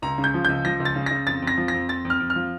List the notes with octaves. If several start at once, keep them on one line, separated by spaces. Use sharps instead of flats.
C#2 A#5
C#3
G6
F3
C#2 G6
F3 A#6
C#2
A6
C#3
C#3 A#6
F2 A6
F2
A#6
F3
A#6
F2
F2 A6
F2
F6
F2
F6
F3